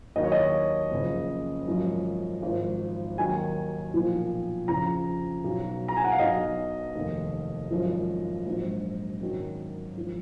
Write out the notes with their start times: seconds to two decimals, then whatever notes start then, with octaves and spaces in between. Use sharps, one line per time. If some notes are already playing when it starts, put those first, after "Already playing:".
0.16 D#2 D#3 F#3 D#5
0.24 C#5
0.32 D#5
0.91 F#1 F2 C#3
1.66 G#1 F#2 F3
2.42 G#1 G#2 F3
3.18 D#2 D#3 F#3 G#5
3.94 B1 A#2 F3
4.68 F2 C#3 F3 A#5
5.44 B1 B2 F#3
5.88 A#5
5.97 G#5
6.04 F#5
6.12 F5
6.19 B1 B2 F#3 D#5
6.95 F1 D#2 D#3
7.71 G#1 F#2 F3
8.46 A#1 G#2 F#3
9.21 G#1 F#2 D#3 F#3
9.97 G#1 F3